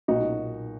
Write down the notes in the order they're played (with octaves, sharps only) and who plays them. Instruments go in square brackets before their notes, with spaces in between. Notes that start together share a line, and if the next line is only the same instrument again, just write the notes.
[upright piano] B1 A#2 F#3 D#4 F#4